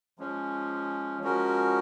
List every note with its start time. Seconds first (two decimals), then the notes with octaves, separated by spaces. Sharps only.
0.19 F3 G#3 C#4
1.21 F3 G#3 C#4 F#4 A#4